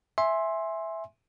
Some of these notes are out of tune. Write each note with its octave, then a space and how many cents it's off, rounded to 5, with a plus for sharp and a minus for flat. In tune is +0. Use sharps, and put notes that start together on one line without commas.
E5 +0 G#5 +0 C6 +15